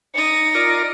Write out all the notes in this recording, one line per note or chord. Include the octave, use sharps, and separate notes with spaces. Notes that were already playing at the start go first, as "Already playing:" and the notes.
D#4 D#5 C#7
F4 A#4 D5